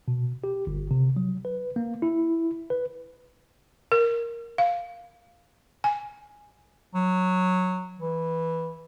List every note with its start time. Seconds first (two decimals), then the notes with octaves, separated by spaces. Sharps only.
0.08 B2
0.44 G4
0.67 G1
0.91 C3
1.16 F#3
1.45 B4
1.76 A#3
2.02 E4
2.70 B4
3.92 A#4
4.58 F5
5.84 G#5
6.95 F#3
8.00 E3